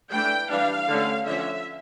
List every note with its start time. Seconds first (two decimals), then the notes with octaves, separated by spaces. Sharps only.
0.12 E3 A3 D4 G5
0.50 E3 G3 D4 F5
0.88 D3 A3 C#4
1.25 D3 F3 C#4 E5